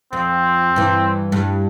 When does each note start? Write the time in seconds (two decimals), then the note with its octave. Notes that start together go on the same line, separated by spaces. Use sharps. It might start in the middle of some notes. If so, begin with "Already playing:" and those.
0.13 F2 C4
0.76 G2 E3
1.32 G2